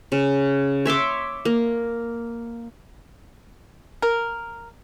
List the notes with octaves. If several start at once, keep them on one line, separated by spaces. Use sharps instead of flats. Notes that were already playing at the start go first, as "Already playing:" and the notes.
C#3
C#5 E5 C6 D6
A#3
A#4